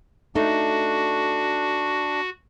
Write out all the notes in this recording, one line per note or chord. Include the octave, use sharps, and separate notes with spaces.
A3 D4 D#4 F#4